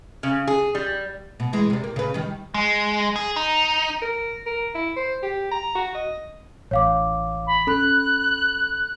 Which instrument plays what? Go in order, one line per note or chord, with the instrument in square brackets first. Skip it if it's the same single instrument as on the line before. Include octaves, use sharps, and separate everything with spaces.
[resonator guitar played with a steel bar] C#3
G#4
G3
[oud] B2
E3 G#3
C3 G3
A#3
C#3 B4
D#3 G3
[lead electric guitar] G#3
G#4
D#4
[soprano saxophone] A#4
A#4
E4
C5
G4
A#5
F#4
D#5
[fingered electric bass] A1 [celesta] C#5 F5 D6
[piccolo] B5
[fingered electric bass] C#4 [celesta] A4 B5 [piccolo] F#6